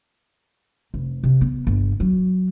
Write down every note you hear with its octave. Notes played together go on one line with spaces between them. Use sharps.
F1
C3
B3
G1
F#3